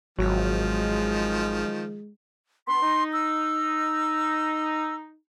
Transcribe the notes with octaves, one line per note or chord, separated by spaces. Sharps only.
G#1 D#3 F3 F#3 G#3
B3 D4 B5 C6
D#4
E6